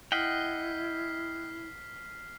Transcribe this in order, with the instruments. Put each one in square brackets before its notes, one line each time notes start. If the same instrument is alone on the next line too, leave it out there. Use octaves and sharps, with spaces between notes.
[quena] E4 [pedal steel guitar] D#5 F#5 G5 [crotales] F6 B6 C7